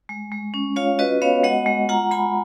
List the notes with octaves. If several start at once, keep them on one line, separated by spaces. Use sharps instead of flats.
G#3
G#3
C#4
F4 C#5 F5
F#4 B4 D#5
B3 C#5 F5
G#3 D#5 F#5
G#3
F4 F#5 A#5
G#3 G#5 B5